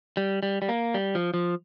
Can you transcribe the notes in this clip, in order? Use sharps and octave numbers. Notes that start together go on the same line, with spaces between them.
G3
G3
G3
A#3
G3
F3
F3